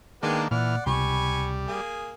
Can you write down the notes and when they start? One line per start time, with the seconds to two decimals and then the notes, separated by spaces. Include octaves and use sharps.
0.23 D#3 G#3 A#3 B3 D4 G5
0.51 A#2 E3 D5 F#5 F6
0.86 C#2 C3 G3 G#5 B5 C#6
1.68 A#3 G#4